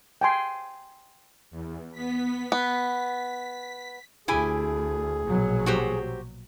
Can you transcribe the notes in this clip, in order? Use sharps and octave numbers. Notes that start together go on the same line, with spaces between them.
G5 G#5 C6
E2
B3 B6
B3 B6
D2 E4 G4 G#4 G#5
A#1 B2 F#3
F#4 G4 C5